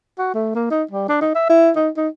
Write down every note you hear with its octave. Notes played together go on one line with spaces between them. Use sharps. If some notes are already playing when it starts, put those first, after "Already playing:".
F#4
A3
A#3
D#4
G3
D4
D#4
E5
E4
D#4
D#4